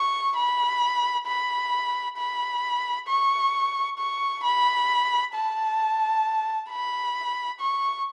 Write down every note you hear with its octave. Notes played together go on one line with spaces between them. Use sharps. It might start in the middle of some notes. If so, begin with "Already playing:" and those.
Already playing: C#6
B5
B5
B5
C#6
C#6
B5
A5
B5
C#6